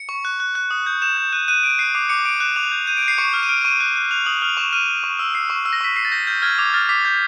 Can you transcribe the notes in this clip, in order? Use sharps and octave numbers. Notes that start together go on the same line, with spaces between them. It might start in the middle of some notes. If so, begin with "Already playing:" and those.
Already playing: C#7
C#6
F#6
F#6
F#6
D#6
G6
G6 E7
G6
F#6 D#7
F#6 D#7
F#6 D7
F#6 C7
D6 C7
D6 C#7
D6 D7
F#6 E7
D6 F7
G6
G6 D#7
D7
G6
C7
C#6 C#7
F6
D#7
F6 D7
C#6 D#7
F#6
F#6
F#6 F7
D#6 F#7
F6 F7
C#6 E7
F6 D#7
F6
C#6
E6
E6 C7
C#6
E6
A#6
C#6 B6
E6 C7
A6
G6 A#6
F6 G6
F6 G#6
D6 G#6
F6 A6
D6 B6
G6